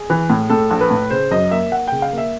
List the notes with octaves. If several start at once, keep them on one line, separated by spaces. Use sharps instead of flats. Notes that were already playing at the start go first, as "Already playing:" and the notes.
Already playing: G#4
E3
A2
A2 A4
A#1
B4
A2
C#3 C5
F#2 D#5
A#3 E5
A#3 F#5
C#3 G5
F5
A#3
E5